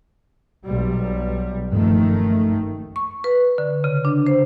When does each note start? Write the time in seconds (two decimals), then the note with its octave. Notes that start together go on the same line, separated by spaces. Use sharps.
0.65 B1 G3
1.72 F#1 G2 D#3 F3 A3
2.96 C#6
3.24 B4
3.58 D3
3.84 C#3
4.05 D4
4.27 C5